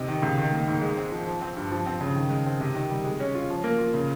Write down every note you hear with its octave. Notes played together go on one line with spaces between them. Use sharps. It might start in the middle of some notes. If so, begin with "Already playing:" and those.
Already playing: C3 D#4
D#3
C#2
D#3
A#3
G#2
G#3
C4
F3
F3
C4
G2
F3
C4
C#3
D#3
G#3
C4
C3
D#3
G3
G#3
C#4
F4
F3
A#3
F4
C#3